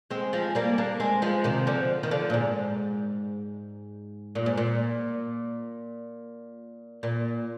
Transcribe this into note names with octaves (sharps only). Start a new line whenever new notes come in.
G#3 C4
F3 G#3
G3 A#3
A#3 D4
G#3 C4
F3 G#3
C3 D#3
D3 F3
D#3
D3 F3
A#2
G#2
A#2
G#2
A#2
A#2